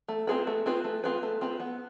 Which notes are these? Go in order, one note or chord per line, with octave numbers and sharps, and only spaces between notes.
A3
C4 F4 G#4 B4
A3
C4 F4 G#4 B4
A3
C4 F4 G#4 B4
A3
C4 F4 G#4 B4
B3